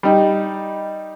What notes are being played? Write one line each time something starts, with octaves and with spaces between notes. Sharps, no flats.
G3 D#4